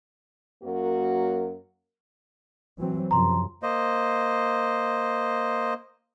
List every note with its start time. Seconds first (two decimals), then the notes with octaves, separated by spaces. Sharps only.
0.63 F#2 F#3 A#3 F#4 A#4
2.78 E3 F#3 C4
3.11 F#2 C3 F3 A#5 C6
3.63 A#3 C5 D#5